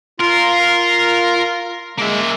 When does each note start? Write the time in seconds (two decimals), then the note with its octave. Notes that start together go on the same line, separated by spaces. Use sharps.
0.20 F4 A#4 C6
1.98 G#3 A#3 E5